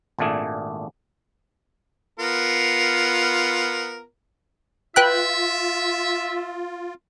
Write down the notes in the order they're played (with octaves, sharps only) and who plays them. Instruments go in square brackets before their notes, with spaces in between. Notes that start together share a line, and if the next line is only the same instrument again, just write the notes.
[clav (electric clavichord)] G#1 A#2 A3 D4 G#4
[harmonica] B3 F4 A#4
[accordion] F4 [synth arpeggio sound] B4 G5 F#6 [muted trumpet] E5